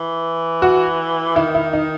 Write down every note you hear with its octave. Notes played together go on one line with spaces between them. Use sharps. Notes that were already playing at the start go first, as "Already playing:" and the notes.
Already playing: E3
F#4
D#3 E4
E4
D#4